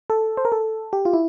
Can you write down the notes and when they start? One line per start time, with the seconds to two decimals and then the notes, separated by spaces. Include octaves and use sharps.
0.10 A4
0.37 C5
0.45 A#4
0.52 A4
0.93 G4
1.05 F4
1.13 E4